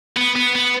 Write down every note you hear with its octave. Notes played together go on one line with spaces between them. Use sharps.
B3
B3
B3